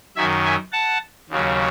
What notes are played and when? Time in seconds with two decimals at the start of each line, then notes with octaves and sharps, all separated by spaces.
0.16 F#2 D#3 F#3 E5 G#5
0.45 E5 G#5
0.72 F#5 A5
1.30 D#2 C#3 F#3